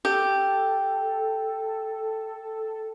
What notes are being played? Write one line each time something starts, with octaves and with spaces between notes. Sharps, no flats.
G4 A4